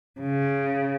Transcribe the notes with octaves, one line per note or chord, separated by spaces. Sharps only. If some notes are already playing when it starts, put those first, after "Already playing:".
C#3